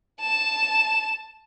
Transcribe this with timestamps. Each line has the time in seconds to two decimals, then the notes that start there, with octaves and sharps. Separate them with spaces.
0.21 A5 E7